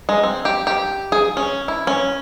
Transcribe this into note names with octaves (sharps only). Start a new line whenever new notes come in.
G#3
C4
G4
G4
G#4
C#4
E4
C#4